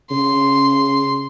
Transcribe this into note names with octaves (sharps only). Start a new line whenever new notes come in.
C#3 C6